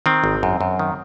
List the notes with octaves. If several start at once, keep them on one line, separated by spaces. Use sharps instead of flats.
D#3 C4
G#1
F#2
F#2
D#3